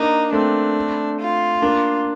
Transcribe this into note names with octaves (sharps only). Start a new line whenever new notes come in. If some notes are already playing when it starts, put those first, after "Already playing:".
Already playing: A#3 D4 D#4
A3 C4 D4
F4
A#3 D4